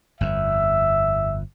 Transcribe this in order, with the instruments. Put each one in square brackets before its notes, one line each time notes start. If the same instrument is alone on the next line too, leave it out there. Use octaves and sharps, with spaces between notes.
[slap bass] G1 F2 [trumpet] E5